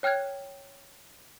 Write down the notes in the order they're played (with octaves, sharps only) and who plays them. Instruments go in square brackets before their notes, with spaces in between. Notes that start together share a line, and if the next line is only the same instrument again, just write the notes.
[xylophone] C#5 G5 F6 F#6 G#6